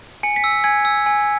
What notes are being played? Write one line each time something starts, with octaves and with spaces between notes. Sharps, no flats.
G#5 C#7
B6
E6
B6
G#5 G#6
E6
G#5